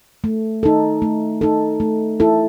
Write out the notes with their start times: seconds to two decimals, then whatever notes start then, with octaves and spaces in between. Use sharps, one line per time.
0.24 A3
0.63 D#4 A4
1.02 A3
1.41 D#4 A4
1.80 A3
2.20 E4 A4